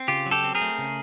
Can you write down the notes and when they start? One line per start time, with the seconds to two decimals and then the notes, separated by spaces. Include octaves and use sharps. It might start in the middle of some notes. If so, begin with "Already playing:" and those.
Already playing: C4
0.08 C#3 F4 G4
0.26 F#3
0.31 G4 A4
0.44 C4
0.55 G#4 A#4
0.61 A3
0.78 C#3